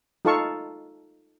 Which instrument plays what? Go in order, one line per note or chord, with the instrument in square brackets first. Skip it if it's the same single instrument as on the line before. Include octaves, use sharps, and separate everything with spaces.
[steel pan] D#4 F4 A4 F5 A5 C#6